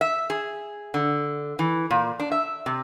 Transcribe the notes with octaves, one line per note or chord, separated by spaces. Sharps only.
E5
G#4
D3
E3
A#2
D4
E5
C3